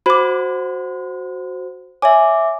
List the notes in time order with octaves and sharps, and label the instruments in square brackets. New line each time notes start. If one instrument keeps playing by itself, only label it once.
[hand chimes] F#4 C5 [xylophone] B5 D6
[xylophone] C#5 G#5 [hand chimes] E5 D6